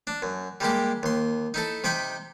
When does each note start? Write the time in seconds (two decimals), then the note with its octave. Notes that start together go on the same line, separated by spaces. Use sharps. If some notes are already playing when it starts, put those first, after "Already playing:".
0.07 D4
0.22 F#2
0.60 G3 G#3 A#3 G4
1.03 D#2 C6
1.54 D#4 E4 A4
1.84 C3 D#4 G5 B5